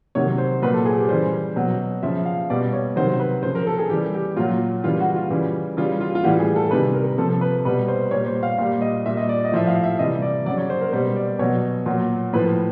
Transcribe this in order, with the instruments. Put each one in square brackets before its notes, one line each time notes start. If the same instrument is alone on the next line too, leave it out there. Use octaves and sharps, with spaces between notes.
[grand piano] C3 D#3 F#3 C#5
C5
A#2 F#3 B4
A4
G#4
G4
C#3 E3 G3 C5
B2 F#3
C#3 F3 E5
F5
B2 G3 D5
C#5
C3 D#3 F#3 C5
B4
C#3 F3 C5
A#4
A4
G#4
C#3 E3 G3 G4
G4
A#2 F#3 F4
C#3 E3 G3 F4
F#4
F4
C#3 E3 G3
C#3 E3 G3 F4
F4
F4
A2 E3 G3 F#4
G#4
A4
C3 D#3 G3 B4
A#4
C3 F3 A4
B4
B2 G3 B4
C5
A#2 G3 C#5
C5
F5
A#2 G3 F5
D#5
A#2 G3 E5
D#5
D5
D#5
A2 F3 E5
F5
E5
C3 E3 G3 D#5
D5
C#3 F#3 D5
C#5
C5
A#4
B2 G3 C5
D5
B2 F#3 C#5
A#2 F#3
A2 F3 B4